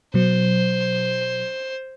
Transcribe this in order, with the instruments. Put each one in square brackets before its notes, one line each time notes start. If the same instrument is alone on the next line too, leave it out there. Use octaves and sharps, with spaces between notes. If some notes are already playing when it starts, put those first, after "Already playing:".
[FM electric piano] B2 F#3 [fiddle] C5